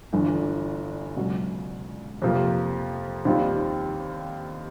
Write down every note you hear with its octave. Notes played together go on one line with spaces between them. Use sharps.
G1 G2 E3 A3 D4
C#2 B2 F#3
F2 C3 F3 A#3
D#2 D#3 G3 C4 F4